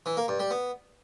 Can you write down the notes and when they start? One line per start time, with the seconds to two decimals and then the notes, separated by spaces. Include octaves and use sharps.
0.06 E3
0.17 A#3
0.28 G2
0.39 G3
0.51 B3